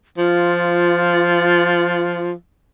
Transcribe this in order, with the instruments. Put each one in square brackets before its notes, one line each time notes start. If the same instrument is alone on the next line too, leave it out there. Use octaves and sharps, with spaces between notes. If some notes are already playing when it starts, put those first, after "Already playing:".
[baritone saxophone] F3 [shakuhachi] F4